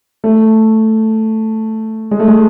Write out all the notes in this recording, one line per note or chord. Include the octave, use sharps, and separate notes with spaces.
A3
G#3
A3
G#3